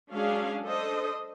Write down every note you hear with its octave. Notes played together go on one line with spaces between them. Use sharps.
F#3 G#3 C#4 D4 G#4 F5
D4 A4 C5 D#5